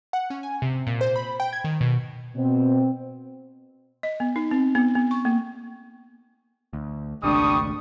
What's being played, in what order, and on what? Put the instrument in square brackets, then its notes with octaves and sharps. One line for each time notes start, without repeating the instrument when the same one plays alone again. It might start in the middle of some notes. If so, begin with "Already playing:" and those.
[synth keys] F#5
C#4
G#5
C3
A#2
C5
B5
G5
G#6
D#3
B2
[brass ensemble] B2 C4
[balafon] D#5
B3
D#4
C4
B3
B3
C#6
A#3
[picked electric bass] D2
[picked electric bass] G#1 C#2 A3 [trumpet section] G3 C#6 D#6 [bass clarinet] D4